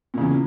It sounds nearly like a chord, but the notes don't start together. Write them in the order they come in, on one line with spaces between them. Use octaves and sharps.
A#2 C#3 E2